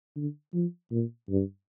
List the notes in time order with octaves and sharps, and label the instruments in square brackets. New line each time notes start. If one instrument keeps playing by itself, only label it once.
[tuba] D3
F3
A#2
G2